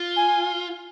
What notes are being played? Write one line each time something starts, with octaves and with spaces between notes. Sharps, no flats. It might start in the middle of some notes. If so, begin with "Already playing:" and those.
Already playing: F4
G#5